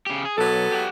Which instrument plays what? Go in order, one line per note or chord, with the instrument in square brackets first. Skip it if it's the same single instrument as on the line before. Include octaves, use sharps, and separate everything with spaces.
[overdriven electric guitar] C#3 G4
G#4
[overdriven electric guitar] B1 [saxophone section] F#3 B3 A4
[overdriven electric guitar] G4 F#5